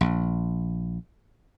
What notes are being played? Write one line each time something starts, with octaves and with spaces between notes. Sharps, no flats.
A#1